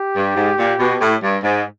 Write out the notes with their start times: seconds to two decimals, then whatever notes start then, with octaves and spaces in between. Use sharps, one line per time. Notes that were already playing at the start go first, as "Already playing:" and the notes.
Already playing: G4
0.15 G2
0.36 G#2
0.58 A#2
0.79 B2
1.00 A2
1.22 G2
1.43 G#2